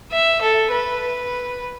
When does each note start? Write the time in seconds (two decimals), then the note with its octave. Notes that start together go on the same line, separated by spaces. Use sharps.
0.12 E5
0.41 A4
0.71 B4